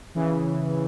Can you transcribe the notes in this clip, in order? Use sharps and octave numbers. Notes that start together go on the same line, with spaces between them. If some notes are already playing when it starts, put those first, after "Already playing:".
C#3 E3